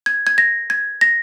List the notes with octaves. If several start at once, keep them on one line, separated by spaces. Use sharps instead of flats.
G#6
G#6
A#6
G#6
A#6